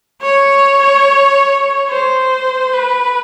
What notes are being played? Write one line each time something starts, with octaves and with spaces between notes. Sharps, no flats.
C#5
C5
B4